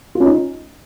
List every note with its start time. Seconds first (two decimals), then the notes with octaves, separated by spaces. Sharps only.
0.15 F4
0.20 C#4
0.26 D#4